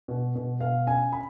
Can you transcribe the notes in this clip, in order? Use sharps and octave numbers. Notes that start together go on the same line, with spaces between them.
B2
B2
B2 F5
C#4 G#5
B5